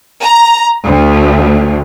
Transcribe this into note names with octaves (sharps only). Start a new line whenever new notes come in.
A#5
D2